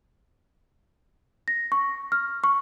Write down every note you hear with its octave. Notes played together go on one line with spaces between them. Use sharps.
A#6
C#6
F6
C#6